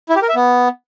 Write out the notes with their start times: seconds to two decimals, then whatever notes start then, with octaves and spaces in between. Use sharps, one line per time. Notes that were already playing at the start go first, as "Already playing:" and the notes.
0.09 E4
0.16 G4
0.22 A#4
0.29 E5
0.35 B3